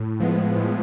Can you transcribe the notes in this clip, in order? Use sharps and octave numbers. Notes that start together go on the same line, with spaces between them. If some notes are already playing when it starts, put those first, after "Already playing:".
Already playing: A2
F3 G#3 B3
A2